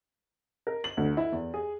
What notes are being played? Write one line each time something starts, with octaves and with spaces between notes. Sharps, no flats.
A#4
F#7
D2
E4
E2
G#4